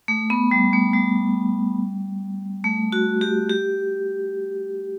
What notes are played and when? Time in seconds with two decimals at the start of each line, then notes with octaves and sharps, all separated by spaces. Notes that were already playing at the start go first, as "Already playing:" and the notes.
0.08 A3
0.30 B3
0.51 G3
0.73 A3
0.94 G3
2.64 A3
2.92 F#4
3.21 G4
3.50 G4